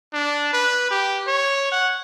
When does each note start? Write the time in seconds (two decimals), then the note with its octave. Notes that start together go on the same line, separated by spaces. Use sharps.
0.13 D4
0.53 B4
0.91 G4
1.27 C#5
1.72 F#5